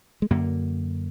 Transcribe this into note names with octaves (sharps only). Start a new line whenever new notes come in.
G#3
F#2 D3 A#3